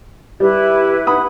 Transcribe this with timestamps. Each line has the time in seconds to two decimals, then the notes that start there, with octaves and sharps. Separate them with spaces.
0.40 G3 E4 G4 B4
1.07 F#5 B5 D#6